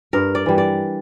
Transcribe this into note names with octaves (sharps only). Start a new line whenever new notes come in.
G2 A#4
D5
E3 G3
D5